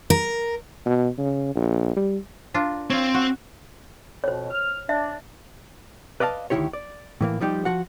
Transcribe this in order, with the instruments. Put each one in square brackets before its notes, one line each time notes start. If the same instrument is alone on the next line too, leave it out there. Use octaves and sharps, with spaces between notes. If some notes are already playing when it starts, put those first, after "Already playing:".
[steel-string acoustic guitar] A#4
[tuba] B2
C#3
A#1
G3
[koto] D4 F4 A#4
[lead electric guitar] C4 [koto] F4 C#5
[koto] F#4
[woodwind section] F2 B2 [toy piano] C5 C#5
[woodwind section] F6
[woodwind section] D4 [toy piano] E5
[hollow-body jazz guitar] B4 D5 D#5 F5 A5
D2 D#3 E3 E4 G4 C#5
D5
A2 E3 A#3
F3 G3 D#4 G4
F3 F#4 F#5